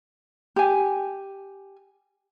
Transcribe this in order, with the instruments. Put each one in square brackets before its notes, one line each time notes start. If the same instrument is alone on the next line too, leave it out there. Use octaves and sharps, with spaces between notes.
[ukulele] G4 G#5